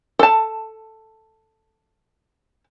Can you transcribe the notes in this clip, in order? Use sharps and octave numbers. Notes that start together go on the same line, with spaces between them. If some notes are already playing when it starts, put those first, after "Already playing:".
A4 A5